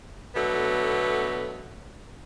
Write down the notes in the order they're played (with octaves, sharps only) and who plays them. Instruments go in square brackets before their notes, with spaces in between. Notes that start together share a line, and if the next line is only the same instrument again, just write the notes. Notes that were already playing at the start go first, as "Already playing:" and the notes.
[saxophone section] B2 D3 F#3 A3 B3